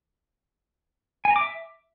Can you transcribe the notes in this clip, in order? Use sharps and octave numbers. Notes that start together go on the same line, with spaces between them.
G#5
A#5
D6
E5